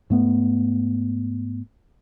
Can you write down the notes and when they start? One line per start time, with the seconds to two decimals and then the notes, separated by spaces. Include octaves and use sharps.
0.10 G#2 A3 B3